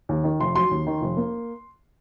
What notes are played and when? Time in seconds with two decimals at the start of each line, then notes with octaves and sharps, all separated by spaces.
0.09 D#2
0.24 D#3
0.40 F1 C6
0.56 F#3 C6
0.71 D#2
0.87 D#3
1.02 F1
1.17 A#3